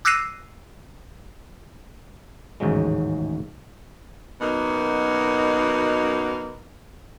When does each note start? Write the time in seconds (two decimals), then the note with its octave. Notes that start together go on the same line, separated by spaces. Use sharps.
0.05 D6 E6 F#6 A#6 C7 D#7
2.60 A1 D#2 G#2 C#3 F#3 G#3
4.41 F#2 B2 A#3 D#4